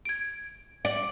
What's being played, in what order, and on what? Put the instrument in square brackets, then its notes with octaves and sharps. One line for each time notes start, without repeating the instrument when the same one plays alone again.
[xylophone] G#6 D7
[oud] D5